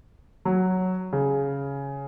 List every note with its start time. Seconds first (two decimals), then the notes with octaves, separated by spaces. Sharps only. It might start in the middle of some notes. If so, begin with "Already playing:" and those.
0.45 F#3
1.13 C#3